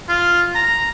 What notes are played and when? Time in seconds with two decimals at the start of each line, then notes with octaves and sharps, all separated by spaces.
0.09 F4
0.55 A#5